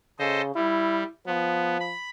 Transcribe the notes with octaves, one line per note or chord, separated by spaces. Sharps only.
C#3 A4 C5 D#5
G3 E4
F3 B3
B5